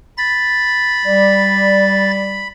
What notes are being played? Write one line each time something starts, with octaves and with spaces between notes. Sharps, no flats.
B5 A6
G3 D5